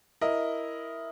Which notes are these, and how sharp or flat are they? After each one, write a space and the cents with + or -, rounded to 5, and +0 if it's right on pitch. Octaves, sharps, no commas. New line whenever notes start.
E4 +0 A#4 +0 D#5 +0